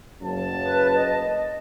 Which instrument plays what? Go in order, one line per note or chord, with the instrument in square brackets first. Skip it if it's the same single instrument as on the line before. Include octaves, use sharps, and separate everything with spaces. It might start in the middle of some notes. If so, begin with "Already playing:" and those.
[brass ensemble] F#1 F#2 A5
[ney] B4
D#5